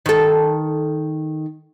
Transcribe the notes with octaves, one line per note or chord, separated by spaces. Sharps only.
D#3 A4